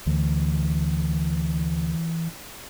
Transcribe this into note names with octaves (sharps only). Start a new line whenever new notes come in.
D2 E3